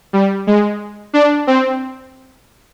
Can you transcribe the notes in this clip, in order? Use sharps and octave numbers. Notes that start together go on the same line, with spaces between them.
G3
G#3
D4
C4